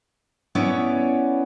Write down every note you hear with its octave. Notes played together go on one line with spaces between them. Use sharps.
B3 C#4 E4 C#5 D5